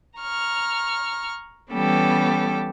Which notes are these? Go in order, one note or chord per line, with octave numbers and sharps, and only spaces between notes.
A#5 C#6 F6
E3 G3 B3 C#4 G4 A4